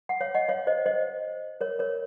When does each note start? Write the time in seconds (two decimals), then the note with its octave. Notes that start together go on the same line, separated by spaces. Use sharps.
0.09 F#5
0.21 C#5 F5
0.35 D#5 F#5
0.49 C#5 F5
0.67 C5 D#5
0.86 C5 D#5
1.61 A#4 C#5
1.79 A#4 C#5